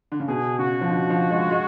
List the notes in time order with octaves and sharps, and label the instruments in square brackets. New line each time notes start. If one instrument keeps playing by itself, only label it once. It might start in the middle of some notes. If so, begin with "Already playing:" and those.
[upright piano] D3
C#3
[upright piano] B2 [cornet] G#4
[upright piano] C#3 [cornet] F#4
[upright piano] F3
D3
F3
G#3
G#3